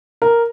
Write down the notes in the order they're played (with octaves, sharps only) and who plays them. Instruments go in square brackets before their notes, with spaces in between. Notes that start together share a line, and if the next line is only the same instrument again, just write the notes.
[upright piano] A#4